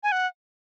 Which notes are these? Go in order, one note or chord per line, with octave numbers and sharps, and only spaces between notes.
G#5
F#5